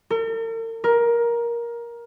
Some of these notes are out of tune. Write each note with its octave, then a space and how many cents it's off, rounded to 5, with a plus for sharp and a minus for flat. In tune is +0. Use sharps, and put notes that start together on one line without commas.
A#4 -45
A#4 +15